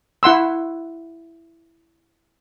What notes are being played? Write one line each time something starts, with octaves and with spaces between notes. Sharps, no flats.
E4 F#5 C6 E6